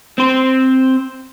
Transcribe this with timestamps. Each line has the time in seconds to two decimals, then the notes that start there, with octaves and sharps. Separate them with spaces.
0.18 C4 C5